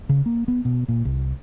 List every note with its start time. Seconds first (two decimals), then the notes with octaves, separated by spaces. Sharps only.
0.09 C#3
0.26 A#3
0.48 B3
0.65 B2
0.89 A#2
1.05 C2